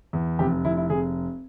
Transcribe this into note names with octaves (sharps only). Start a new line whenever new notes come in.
E2
F1 G4
F1 E4
E4
F1 G#4